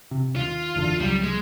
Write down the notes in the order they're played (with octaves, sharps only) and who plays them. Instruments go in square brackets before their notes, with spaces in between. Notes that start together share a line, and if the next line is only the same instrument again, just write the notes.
[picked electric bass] C3
[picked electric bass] D#2 [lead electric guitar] F4
[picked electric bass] F#1 E2 D3
[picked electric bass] C#2 F#3 [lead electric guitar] G3
[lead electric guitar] G#3